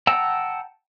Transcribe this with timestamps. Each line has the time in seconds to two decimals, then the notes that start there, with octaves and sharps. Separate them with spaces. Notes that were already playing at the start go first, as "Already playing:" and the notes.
0.07 F#5 G5 A5 A#5 E6